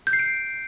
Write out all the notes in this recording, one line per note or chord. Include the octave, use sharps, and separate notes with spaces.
G6
C7
D7